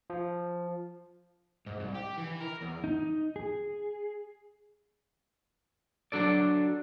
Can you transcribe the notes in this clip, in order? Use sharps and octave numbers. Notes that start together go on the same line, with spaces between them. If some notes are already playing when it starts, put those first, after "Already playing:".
F3
G#2
C2
G4
E3
A#4
E2
D#4
G#4
F#3 D4 A4 D5